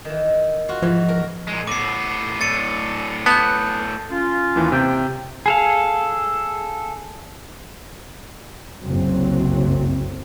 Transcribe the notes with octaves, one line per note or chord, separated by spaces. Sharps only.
D#3 E3
F4 F#4
G#2 E3 F3
A#4
A#2 G#3
A2 B3 D6 C7
A2 D3 A6 C#7 D#7
B3 A5 G6
C#4 F4
D#2 E3
C3 G5
G#4 A4 F5
F#1 C2 F#3 C4